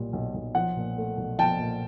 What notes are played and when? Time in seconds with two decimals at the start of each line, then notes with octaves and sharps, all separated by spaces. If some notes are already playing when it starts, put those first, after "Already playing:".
Already playing: B1 A#2 G3
0.13 B1
0.34 B1
0.55 F3 F#5
0.77 A#2
0.97 A3
1.17 B1
1.38 F3 G5 A5
1.60 A#2